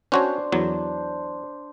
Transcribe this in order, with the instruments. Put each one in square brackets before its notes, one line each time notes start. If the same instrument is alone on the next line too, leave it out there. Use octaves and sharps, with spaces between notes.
[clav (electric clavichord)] C#4 F#4 C#5 [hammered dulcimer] D4 C5
[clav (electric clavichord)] E2 F#3